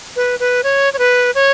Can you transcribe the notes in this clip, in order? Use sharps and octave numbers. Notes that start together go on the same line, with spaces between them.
B4
B4
C#5
C#5
B4
C#5